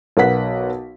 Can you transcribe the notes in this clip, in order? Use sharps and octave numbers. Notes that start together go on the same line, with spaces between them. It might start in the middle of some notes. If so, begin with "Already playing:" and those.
B1 A#4 B4 F#5 B6